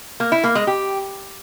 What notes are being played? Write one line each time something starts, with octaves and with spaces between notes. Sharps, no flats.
A#3
E4
A#3
G#3
G4